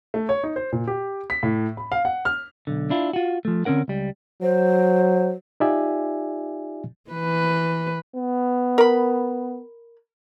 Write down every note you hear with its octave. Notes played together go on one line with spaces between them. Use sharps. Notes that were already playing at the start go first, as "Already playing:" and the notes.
A3
C#5
D#4
C5
A#2
G4
B6
A2
B5
F5
F#5
F6
B1 D3
D4 E4 F4
F4 F#4
F3 A3
D3 C4 C#4 A#4 F#5
C#2 G3
F#3 C5
D#4 F4 G4 D5 E5 G#5
E3 B4
B3
A#4 B5